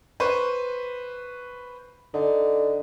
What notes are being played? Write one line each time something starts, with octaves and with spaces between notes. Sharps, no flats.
B4 C5 C#6
D3 D#4